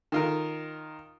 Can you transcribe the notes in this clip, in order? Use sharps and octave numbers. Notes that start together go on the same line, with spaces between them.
D#3 F4 A#4